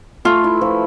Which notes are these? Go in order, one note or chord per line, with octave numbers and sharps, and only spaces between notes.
A3 F4
E4
F3